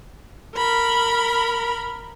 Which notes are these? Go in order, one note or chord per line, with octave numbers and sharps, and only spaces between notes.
A#4 B5